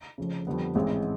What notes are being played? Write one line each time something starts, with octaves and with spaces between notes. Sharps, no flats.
F1 F2 C#3
F2 D3 G3 B3
A1 G#2 E3 G#3 C4